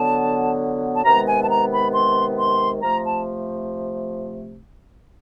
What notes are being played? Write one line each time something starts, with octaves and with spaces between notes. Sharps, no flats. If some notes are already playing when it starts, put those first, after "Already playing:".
Already playing: D3 F#3 B3 A5
A5
C3 D#3 G#3 B3 A#5
G#5
A5
A#5
B5
C6
C6
C3 F3 A3 A#5
A5